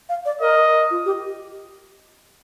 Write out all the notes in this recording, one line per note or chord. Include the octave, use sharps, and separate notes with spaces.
F5
D5
A#4 D#5
F4
G4